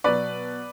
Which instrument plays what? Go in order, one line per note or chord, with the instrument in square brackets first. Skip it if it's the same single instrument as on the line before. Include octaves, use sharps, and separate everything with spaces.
[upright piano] B2 F#3 B3 B4 D5